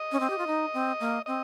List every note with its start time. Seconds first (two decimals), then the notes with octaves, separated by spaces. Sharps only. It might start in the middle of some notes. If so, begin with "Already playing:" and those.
Already playing: D#5
0.12 C#4
0.20 C4
0.30 G4
0.38 F4
0.47 D#4
0.73 C4
1.00 A#3
1.26 C4 D#5